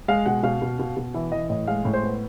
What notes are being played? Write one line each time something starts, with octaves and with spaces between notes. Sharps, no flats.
G#3 F5
B2 F#5
B2 F5
B2
B2
B2
E3 E5
E3 D#5
A2 D#5
G#3 F5
A2
C5
B3